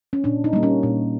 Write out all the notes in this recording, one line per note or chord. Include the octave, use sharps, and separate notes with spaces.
C#4
A#2 D4
D#4
G3 A#3
C#4
A#2